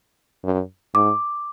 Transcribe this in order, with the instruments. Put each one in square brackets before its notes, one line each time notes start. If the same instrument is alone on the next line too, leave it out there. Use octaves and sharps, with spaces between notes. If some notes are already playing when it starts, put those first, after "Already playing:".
[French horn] F#2
[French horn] G#2 [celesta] D6